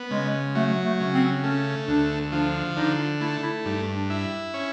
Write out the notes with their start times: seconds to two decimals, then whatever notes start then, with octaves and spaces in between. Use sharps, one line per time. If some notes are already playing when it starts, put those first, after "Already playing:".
Already playing: B3
0.11 C#3 G#3
0.55 F#3 A3
0.85 A3
1.00 C#3
1.14 C4
1.44 A3 C#4
1.88 D2 D4
2.32 F3 D4
2.77 D3 D#4
3.21 A3 E4
3.43 E4
3.65 G2 D#4
3.88 D4
4.10 E4
4.54 C#4